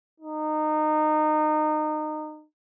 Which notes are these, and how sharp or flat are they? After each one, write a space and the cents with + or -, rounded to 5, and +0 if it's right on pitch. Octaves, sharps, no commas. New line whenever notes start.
D#4 -25